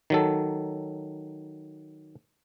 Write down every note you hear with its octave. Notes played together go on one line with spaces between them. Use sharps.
D#3 F#3 A4